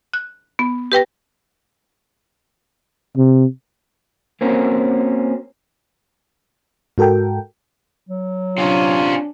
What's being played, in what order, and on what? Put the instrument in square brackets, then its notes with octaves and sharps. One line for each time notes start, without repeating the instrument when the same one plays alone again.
[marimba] F#6
B3
G4 B4 G5 A#6
[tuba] C3
[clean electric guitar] A#3 C4 C#4 F#4 A#4
[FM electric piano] G#2 F#4 A4 A#4 G5
[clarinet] F#3
[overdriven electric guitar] C3 C#4 [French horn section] D4 [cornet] F4